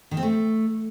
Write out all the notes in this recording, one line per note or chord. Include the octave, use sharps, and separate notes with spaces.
D#3
C4
A3